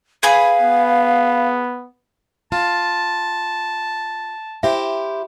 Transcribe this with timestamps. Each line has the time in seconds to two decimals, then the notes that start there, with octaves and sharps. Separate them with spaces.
0.23 G#4 B4 F5 G#5
0.62 B3
2.52 F4 A5
4.63 E4 G4 C5 E5